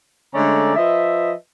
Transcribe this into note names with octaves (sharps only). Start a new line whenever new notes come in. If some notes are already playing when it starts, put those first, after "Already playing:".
D3 G#3 A3 C#4 D5 A#5
F3 B4 D#5 E5